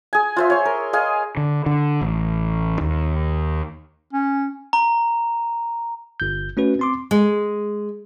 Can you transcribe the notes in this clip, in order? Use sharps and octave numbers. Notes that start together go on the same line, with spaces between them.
G#4 G#5
F4 C5 E5
C#5 C6
A#4
G#4 D#5 F5 G#5
D3
D3
A1
D#2
C#4
A#5
G1 G6
A3 C#4 F#4 B4
C4 C6 D6
G#3